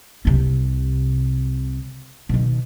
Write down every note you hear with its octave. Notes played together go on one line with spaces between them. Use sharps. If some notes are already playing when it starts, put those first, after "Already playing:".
C2 C3
B2 D#3